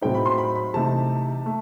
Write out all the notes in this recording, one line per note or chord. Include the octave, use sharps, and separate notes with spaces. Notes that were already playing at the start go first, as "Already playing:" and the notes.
A2 F#3 C4 D#4 G5
B5
C6
B5
B5
C3 E3 A3 D#4 A5
A3